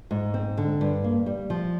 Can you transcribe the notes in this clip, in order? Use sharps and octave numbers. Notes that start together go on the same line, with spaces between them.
G#2
C4
D3
G2
A#3
G3
F3